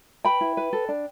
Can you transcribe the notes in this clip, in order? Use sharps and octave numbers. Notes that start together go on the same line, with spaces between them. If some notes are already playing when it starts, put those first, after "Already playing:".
B4 G5 B5
E4
B4
A4
D4